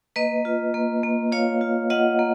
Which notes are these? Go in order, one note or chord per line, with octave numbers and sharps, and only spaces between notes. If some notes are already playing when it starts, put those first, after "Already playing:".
A#3 B4 D#5
F4
A#3
A#3
F4 C#5 F5
F4
F4 D#5 F#5
A#3